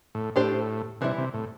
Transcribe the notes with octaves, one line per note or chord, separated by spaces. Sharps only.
A2
A2 D4 G4 C5
C3 E3 G3 E4
C3
A2